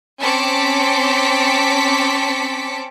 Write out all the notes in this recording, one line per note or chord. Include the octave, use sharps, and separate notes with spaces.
C4 C#4 A5 D6 B6 C#7